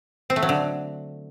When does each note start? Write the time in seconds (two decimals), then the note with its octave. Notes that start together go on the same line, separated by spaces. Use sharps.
0.30 C4
0.36 A3
0.43 F#3
0.49 D3